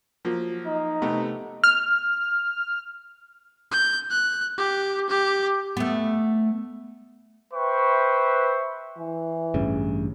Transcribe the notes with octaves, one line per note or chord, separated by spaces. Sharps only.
F3 F#3 A#3
D#4
C3 A3 B3
F6
G6
F#6
G4
G4
A3 B3
B4 C5 E5 G5 C#6
E3
A1 G2 C#3